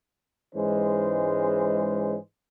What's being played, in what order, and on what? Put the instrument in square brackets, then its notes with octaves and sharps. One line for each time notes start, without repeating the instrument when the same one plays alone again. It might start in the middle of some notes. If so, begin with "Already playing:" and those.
[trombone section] G#2 E3 G#3 C#4 C5